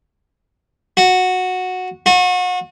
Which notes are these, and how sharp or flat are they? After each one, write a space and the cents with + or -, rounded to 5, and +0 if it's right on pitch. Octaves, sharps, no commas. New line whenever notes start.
F#4 -10
F#4 -35